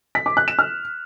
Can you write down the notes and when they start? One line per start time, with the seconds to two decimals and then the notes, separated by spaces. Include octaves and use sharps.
0.15 B6
0.26 D6
0.37 F#6
0.48 E7
0.59 F6